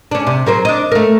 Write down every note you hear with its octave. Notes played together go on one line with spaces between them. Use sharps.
C#4 D4
C3
F#3 A#4 C5
D4 D#5
A3 A#4